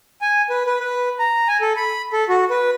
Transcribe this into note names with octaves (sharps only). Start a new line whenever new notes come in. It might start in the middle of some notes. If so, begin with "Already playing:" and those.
G#5
B4
B4
B4
A#5
G#5
A4
B5
A4
F#4
B4